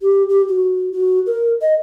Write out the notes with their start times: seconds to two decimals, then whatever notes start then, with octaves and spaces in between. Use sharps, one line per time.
0.02 G4
0.29 G4
0.48 F#4
0.92 F#4
1.26 A#4
1.61 D#5